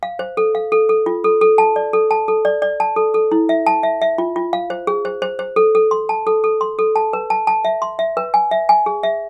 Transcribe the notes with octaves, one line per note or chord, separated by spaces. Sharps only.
F5
C5
A4
F5
A4
A4
F4
A4
A4
A5
D5
A4
A5
A4
D5
D5
A5
A4
A4
E4
E5
A5
E5
E5
F4
F4
F5
C5
G#4
C5
C5
C5
A4
A4
C6
A5
A4
A4
C6
A4
A5
B4
A5
A5
E5
C6
E5
B4
G#5
E5
G#5
G#4
E5